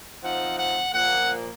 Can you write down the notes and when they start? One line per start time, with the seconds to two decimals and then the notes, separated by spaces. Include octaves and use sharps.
0.24 F3 C4 D#4 F#5
0.59 F#5
0.93 A#2 F3 A#3 F#5